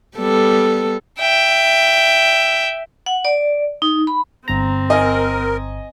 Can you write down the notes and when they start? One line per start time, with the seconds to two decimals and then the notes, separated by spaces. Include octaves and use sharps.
0.17 G3 B3 A4
1.20 E5 G5
3.06 F#5
3.25 D5
3.82 D#4
4.07 B5
4.48 G1 C4 A#5
4.90 A#4 D#5 G#5